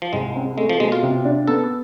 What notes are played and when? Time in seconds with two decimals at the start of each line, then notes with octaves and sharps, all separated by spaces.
0.02 F3
0.13 C2 G#3
0.35 C4
0.57 G#3 A3
0.69 F3
0.80 B2 G#3
0.92 F4
1.03 C3
1.25 D4
1.47 B3 A4